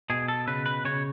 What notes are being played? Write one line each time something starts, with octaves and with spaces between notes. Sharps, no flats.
B2 G#4
A4
C#3 B4
B4
C#3 C#5